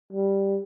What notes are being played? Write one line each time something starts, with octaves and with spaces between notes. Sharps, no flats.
G3